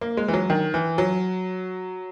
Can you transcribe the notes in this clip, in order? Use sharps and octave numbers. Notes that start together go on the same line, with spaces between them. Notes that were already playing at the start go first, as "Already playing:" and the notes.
A#3
G#3
E3
F#3
D#3
E3
F#3